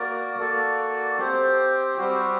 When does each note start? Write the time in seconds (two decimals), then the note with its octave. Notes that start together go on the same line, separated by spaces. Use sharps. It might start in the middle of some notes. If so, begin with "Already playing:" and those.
Already playing: A#3 F#4 A#4 D5
0.39 A#3 F#4 A4 D5
1.18 C4 G4 C5
1.97 G3 C4 F#4